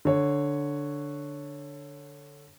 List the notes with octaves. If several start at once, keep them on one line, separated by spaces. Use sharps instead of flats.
D3 C#5